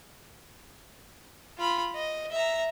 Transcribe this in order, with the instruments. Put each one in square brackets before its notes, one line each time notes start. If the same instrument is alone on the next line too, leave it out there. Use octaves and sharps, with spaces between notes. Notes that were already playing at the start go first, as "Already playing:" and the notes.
[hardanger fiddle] F4 B5
D#5
E5 A#5